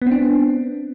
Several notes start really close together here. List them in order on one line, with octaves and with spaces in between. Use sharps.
B3 C4 D4